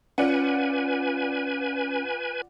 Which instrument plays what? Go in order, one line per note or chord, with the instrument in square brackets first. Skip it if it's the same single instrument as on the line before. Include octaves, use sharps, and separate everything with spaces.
[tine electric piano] C#4 [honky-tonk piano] F4 D5 F#5 [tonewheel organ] B4 G#5